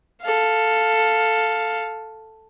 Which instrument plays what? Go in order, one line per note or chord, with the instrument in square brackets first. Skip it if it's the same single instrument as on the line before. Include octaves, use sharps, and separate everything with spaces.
[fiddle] A4 F5